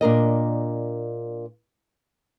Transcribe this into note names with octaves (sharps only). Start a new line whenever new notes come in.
A#2 D4 A#4 D#5